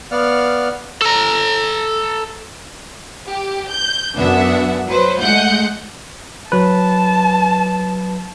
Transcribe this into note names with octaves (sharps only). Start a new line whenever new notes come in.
B3 D5 F5 F#5 F6
A4 A#5
G4
G6
F#2 B3 D4 E5 F#5
F#3 B4 C5
G#3 A3 F#5 G6
F#3 B4 A5